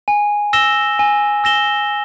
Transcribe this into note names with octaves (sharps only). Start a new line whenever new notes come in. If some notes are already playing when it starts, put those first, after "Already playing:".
G#5
E6 A#6 E7 G7
G#5
E6 A#6 E7 G7